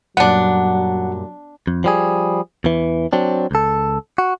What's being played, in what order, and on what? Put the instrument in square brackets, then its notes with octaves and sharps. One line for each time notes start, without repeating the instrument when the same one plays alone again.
[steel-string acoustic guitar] F#2 A#2 G3 [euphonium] F#3 [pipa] B3 D4 [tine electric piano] F#5
[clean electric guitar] F2
F3 G3 G#4
E2 E3
F#3 C4 D4
C#2 A4
F#4